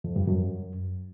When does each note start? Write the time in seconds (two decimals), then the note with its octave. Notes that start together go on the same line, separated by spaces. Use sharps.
0.04 F2
0.16 G2
0.27 F#2